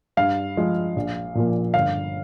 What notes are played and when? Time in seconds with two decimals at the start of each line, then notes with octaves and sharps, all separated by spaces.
0.17 G2 F5
0.57 F3 G#3
0.96 A#1
1.35 A#2 F3 A#3
1.74 G1 F5